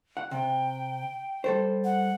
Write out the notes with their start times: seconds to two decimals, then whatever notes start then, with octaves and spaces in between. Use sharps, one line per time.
0.17 F#5
0.31 C3 G5
1.44 G3 A4 C5
1.84 F#5